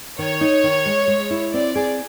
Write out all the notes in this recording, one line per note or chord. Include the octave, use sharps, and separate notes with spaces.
D#3 C#5
D#4
D#3
G#3
G#3
E4
C4 D5
G#4